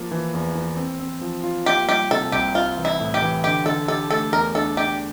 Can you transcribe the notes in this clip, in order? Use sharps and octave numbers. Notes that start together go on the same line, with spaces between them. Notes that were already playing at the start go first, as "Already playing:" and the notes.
Already playing: F3 A#3
E3
E2
E3
C4
C4
F3
F4
A#3 G4
G3 G4
C3 A4
C2 G4
C4 F4
E3
E4
A2
G4
E3
D3 G4
D3 A4
G4 A4
A3 A4
E2 A#4
D4 A4
D4 G4